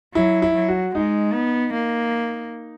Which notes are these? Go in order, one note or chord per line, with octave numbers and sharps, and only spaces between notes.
F#3 E4
E4
F#3
F#4
G#3 D#4
B3
A#3